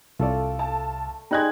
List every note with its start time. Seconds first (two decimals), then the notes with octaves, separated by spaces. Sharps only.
0.19 C2 A3 F4 A4 D5
0.59 A5
1.31 G3 G#3 D#4 F#6 G#6